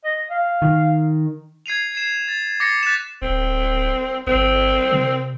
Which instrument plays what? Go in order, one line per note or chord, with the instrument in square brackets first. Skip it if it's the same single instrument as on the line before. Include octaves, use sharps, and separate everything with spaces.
[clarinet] D#5
F5
[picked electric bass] D#3
[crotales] G#6 C7 D#7 F7
C7 E7
A6
D6 A6 A#6 C7 C#7
F#6 A6 B6 E7
[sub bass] D1 [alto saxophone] C4
[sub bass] G1 [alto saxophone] C4
[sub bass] C3